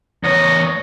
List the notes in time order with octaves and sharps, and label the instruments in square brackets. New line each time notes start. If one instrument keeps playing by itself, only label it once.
[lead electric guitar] E2 C#5 [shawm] D#5